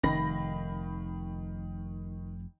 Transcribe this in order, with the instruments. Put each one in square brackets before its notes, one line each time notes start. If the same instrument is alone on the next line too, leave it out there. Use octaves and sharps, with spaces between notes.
[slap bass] F1 [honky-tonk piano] D#3 B5 A#6